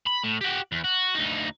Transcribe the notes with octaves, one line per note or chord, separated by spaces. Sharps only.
B5
A2
F#4 G4
E2
F#4
D2 D#4